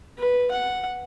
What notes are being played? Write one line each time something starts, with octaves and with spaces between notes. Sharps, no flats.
B4
F#5